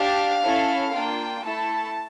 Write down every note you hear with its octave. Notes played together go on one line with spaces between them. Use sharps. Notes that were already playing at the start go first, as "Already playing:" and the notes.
Already playing: D4 G4 F5
C#4 E4 A4
A#3 D4 F4 G5
A3 E4 A4 A5